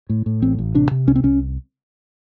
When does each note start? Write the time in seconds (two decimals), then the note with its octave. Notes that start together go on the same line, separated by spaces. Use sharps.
0.09 A2
0.26 A2
0.42 A1 C4
0.58 A1
0.75 C3 D4
0.91 C3
1.07 C2 C#4
1.16 C4
1.23 C2 C#4